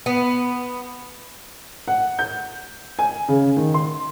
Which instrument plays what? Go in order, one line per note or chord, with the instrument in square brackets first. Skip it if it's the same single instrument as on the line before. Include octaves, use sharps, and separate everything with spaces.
[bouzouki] B3
[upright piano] F#5
G6
G#5
C#3
D#3
C6